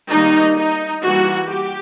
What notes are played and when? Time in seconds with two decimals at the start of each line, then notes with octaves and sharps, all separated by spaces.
0.12 D#3 G3 A#3 D#4
0.56 D#4
1.01 E3 G3 A#3 F#4
1.46 G4